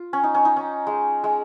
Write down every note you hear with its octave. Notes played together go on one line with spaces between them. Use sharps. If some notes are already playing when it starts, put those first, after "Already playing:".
Already playing: F4
C#4
D#4
C#4
D#4
C#4
G#3
G#3